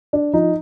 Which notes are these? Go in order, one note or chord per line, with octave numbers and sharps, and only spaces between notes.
D4
F3 D#4